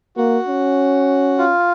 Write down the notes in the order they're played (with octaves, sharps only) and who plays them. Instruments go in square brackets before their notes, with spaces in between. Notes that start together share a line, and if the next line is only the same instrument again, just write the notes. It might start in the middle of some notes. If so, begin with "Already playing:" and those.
[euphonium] A#3 [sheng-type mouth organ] F#4
[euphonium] C#4
[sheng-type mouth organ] F4